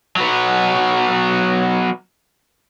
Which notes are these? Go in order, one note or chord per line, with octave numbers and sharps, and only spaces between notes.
F#3 B3